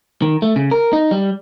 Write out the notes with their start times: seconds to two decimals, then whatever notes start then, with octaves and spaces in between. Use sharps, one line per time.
0.22 D#3
0.42 A3
0.56 C#3
0.71 A#4
0.93 D#4
1.11 G3